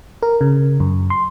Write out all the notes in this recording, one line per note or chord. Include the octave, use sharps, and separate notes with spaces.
A#4
C#3
F#2
C6